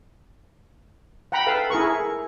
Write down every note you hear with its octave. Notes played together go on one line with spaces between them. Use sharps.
F#5 G5 A#5 B5
A4 B4 F5 A5
E4 G#4 A#4 C#6